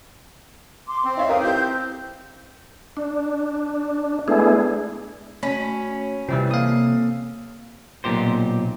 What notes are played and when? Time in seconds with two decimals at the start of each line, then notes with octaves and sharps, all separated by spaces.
0.88 C6 D6
1.05 C4 C5
1.17 D#4 C#5 E5 F5
1.29 A#4 B4 D#6
1.42 E4 G4 C5 G6
2.97 D4
4.28 G#3 A3 B3 D4 E4 G#4
5.43 A3 C#4 F#4 B5
6.29 C3 E3 G3 C4 F4 E5
6.51 A#3 A4 F5 D#6
8.04 B1 A#2 G4 C5